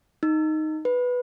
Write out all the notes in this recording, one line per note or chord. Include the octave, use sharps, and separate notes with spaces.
D#4
B4